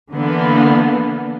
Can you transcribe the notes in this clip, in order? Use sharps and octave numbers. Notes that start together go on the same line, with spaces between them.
D3 E3 A#3 B3